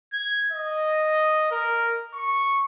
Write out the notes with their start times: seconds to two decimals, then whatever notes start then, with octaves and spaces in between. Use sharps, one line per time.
0.13 G#6
0.52 D#5
1.51 A#4
2.14 C#6